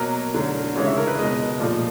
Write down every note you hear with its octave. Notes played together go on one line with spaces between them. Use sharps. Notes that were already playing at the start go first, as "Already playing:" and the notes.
Already playing: B2 F#3 A#3 A#4
D3 F#3 A3
C#3 E3 G#3 C#5
E5
A#4
B4
B2 G#3 D#5
A#2 F3 A3